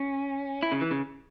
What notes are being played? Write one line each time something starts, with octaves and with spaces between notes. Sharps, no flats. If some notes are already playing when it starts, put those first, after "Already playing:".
Already playing: C#4
E4
C#3
E3
C#3